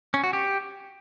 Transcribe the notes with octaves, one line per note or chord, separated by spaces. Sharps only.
C#4
F#4
G4